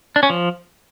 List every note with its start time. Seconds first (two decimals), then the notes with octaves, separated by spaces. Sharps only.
0.16 D4
0.23 C#4
0.30 F3